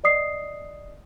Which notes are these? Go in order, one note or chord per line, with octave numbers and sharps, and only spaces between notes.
D5 D#5 D#6 C7